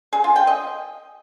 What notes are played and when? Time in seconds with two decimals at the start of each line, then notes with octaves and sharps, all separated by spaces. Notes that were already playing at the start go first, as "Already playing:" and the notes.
0.13 G#4
0.24 F4
0.36 G5
0.47 D#5